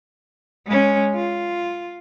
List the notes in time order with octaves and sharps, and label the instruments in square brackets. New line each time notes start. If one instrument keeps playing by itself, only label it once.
[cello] G#3 C#4
F4